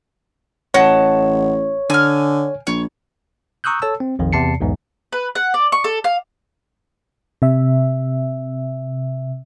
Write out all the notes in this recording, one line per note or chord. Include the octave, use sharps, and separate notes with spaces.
A1 C#5 D#5 F#5 A5
D3 G#5 F6
A#1 C#5
A#5 C#6 D#6 E6 F#6 G6
A4 C#5 A5 E6
C4
A#1 F2 D#3
E2 C3 A5 C7 C#7
B1 E2 G#2
B4
F#5
D5
C#6
A4
F5
C3 E5